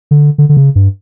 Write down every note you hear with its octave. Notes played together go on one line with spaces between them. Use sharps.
D3
D3
D3
C#3
G2